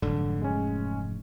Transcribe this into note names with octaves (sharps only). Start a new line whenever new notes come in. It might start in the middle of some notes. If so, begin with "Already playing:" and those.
F1 G#2 D3 F#3
G#3 C#4